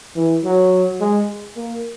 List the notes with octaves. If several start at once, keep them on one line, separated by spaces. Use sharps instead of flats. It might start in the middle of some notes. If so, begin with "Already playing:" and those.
E3
F#3
G#3
A#3